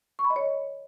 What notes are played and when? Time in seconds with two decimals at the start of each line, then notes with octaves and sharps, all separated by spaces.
0.19 C#6
0.25 B5
0.30 D#5
0.36 C#5